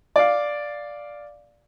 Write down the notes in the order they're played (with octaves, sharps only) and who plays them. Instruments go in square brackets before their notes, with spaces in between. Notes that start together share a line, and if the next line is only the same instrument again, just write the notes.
[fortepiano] D5 F5